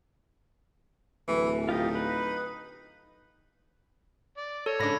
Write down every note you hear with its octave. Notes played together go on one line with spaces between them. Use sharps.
D1 E3
D#4 F4 G4 D#5
B4
D5
A4 C#5
G#2 C#3 D4 B5 A#6